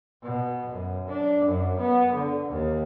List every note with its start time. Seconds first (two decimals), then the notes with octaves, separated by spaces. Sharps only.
0.23 B2
0.71 F#2
1.09 D4
1.45 F#2
1.80 B3
2.14 D3
2.49 D#2